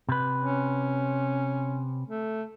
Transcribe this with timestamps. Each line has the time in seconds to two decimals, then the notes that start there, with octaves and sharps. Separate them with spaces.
0.09 C3 B4
0.40 C#4
2.08 A3